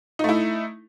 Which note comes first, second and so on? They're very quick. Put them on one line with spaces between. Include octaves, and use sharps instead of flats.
D#4 A3 E4